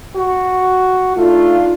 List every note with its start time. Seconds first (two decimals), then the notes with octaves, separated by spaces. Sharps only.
0.16 F#4
1.17 A3 D4 D#4 F4